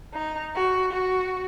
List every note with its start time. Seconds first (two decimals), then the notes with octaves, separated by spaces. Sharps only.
0.14 D#4
0.56 F#4
0.92 F#4